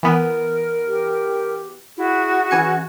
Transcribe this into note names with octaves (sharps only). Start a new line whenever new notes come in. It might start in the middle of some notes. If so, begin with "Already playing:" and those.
E3 B3 A#4
G4
E4 F#4 G#4 E5
E3 C#4 G#5 C#7